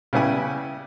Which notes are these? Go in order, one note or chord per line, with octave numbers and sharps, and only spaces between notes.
C#3 G3 B3 E4 G#5